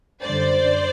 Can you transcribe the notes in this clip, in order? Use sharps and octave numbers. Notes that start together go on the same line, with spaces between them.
F#2 D3 G3 C5 D5